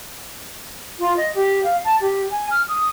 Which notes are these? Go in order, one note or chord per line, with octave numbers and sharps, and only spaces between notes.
F4
D#5
G4
F5
A5
G4
G#5
F6
D#6